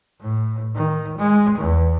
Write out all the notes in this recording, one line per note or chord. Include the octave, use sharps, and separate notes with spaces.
A2
D#3
G#3
E2